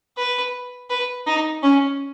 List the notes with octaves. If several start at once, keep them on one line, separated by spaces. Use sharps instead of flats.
B4
B4
D#4
C#4